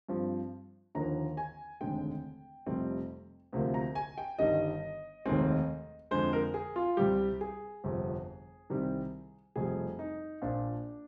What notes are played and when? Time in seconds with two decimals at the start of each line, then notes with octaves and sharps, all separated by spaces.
0.09 G2 F3 C4
0.95 D#2 D3 F3 A#3 A#5
1.37 G#5
1.81 F1 D#2 D3 G#3 C4 G5
2.67 F1 F2 C3 G3 C4
3.53 D2 C3 F3 A#3
3.74 A#5
3.95 G#5
4.18 G5
4.39 G1 G2 D#3 G3 D#5
5.26 F1 D#2 D#3 G#3 C4
6.11 F2 D3 G#3 C5
6.33 A#4
6.54 G#4
6.76 F4
6.97 C2 C3 G3 G4
7.41 G#4
7.84 G1 F2 C3
8.70 C2 C3 D#3 G3 C4
9.56 F1 F2 C3 G3 G#4
9.99 D#4
10.42 A#1 A#2 F3 D4